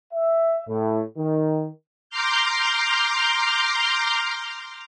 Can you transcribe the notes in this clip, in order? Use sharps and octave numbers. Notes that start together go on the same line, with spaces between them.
E5
A2
D#3
A#5 C6 D6 F6 G6